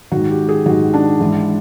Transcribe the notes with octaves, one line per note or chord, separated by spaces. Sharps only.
G#2 D#3 F#4
G4
G#4
G#2 D#3 F#4
D4
G#2 E3